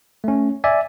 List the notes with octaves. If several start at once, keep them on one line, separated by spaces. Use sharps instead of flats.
A3 C#4
D5 E5 G#5